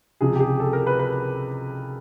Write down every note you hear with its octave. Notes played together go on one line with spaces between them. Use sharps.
C#2 C3 F3 G#4
G4
G#4
A4
A#4
B4
B4